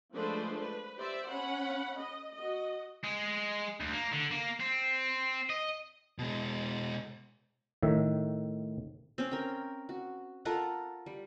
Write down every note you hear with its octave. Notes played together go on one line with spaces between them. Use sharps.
F3 G#3 A3 D4 B4 C5
B4
G4 C5 D5 E5
C#4 F#5 B5
D#5
F#4 D#5
G#3
D2
A#3
D3
A#3
C4
D#5
B2 G#3
A2 D#3 E5
C4 C#4
A#4 G5
F#4
F4 A4 A#4 F#5
G3